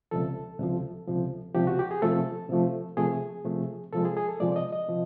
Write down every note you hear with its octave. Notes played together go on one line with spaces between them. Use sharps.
C#2 C3 F3 A4
C#2 C3 F3
C#2 C3 F3
C#2 C3 F3 G4
F#4
G4
G#4
C3 F3 A3 A4
C3 F3 A3
C3 F3 A3 G#4
C3 F3 A3
C3 F3 G#3 A4
G#4
G#4
A4
C3 F3 G#3 D5
D5
D#5
D#5
C3 F3